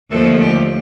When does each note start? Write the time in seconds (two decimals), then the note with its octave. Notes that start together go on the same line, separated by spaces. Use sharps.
0.10 D#2 D3 F3 A3 A4
0.39 G4